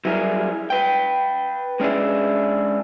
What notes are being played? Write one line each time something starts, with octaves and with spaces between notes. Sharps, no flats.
F#3 G3 E4 G#4 A#4
B4 G5
G#3 C#4 D4 E4 G#4